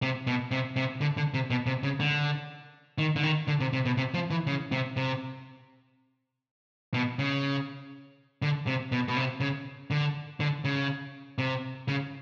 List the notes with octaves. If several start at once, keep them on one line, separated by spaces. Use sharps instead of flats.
C3
B2
C3
C3
D3
D3
C3
B2
C3
C#3
D3
D#3
D3
D#3
D3
C3
C3
B2
C3
F3
E3
C#3
C3
C3
B2
C#3
D3
C3
B2
B2
C3
C#3
D3
D3
C#3
C3
C#3